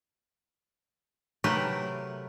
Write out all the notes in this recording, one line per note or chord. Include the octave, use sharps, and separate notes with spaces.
C3 F#3 A3 G4 A#4 B4